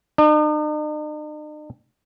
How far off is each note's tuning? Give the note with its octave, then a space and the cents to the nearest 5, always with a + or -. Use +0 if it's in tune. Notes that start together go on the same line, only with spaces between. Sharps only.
D#4 -45